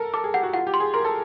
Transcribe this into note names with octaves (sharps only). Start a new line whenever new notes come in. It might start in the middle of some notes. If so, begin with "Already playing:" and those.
Already playing: A4 A#4
A4 D6
G#4
G4 F#5
F#4
F4 F#5
G4
C6
G#4
A#4 C6
A4